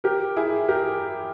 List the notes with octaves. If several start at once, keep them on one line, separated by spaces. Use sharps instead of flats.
G4 A#4
E4 G#4
G4 A#4